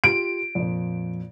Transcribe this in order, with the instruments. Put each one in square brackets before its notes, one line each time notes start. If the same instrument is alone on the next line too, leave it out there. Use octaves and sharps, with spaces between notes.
[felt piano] F4 G4 [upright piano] D7
[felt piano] F2 A#2